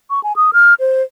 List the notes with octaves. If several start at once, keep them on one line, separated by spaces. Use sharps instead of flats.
C#6
G#5
D#6
F6
C5